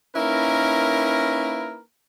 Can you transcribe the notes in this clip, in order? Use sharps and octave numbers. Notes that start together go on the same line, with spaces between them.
A#3 C#4 D#4 E4 A#4 B4